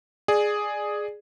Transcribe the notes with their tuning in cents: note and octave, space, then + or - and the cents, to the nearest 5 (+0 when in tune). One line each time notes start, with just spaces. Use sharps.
G#4 +0 D5 +20